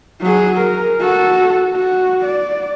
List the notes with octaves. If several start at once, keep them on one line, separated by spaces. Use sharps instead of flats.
F#3 G#4
A#4
F#4 A4
F#4
D5